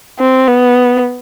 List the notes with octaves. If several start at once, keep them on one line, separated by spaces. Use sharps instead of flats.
C4
B3